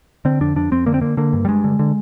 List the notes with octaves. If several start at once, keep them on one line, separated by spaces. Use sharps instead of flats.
D3 C4
F2 D4
F2 D4
F2 C4
D3 A#3
C4
D3 A#3
D3 A#3
G2
G3
G2 G#3
D3
D3